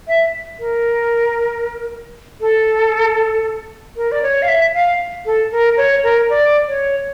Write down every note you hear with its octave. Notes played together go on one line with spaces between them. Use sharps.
E5
A#4
A4
A#4
D5
C#5
F5
E5
F5
A4
A#4
C#5
A#4
D5
C#5